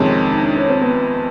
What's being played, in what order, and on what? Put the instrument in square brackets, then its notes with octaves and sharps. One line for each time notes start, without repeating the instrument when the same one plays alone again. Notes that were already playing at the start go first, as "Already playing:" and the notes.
Already playing: [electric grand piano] F2 C3 D#3 G#3 [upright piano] C#4
[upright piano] D#4
D4
C#4
C4
B3